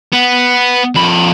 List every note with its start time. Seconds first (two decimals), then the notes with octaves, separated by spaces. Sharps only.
0.13 B3
0.96 F2 B5